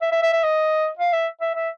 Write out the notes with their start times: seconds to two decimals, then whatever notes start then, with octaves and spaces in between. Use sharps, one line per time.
0.02 E5
0.12 E5
0.23 E5
0.33 E5
0.43 D#5
0.99 F5
1.13 E5
1.41 E5
1.55 E5